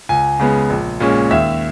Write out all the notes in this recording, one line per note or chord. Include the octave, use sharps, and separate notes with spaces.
C#2 G#5
C#3 G#3 B3
A#1
A#2 G#3 C#4
D#2 E5